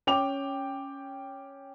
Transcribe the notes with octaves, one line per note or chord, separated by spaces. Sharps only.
C#4 G5 D6 F7